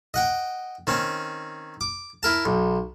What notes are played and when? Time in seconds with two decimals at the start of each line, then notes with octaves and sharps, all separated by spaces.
0.14 D#5 F#5 G5
0.87 D#3 C4 C#4
1.81 D6
2.23 E4 A#4 A5
2.45 B1